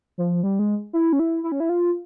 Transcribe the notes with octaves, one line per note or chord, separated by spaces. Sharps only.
F3
G3
G#3
E4
C#4
E4
E4
C#4
E4
F4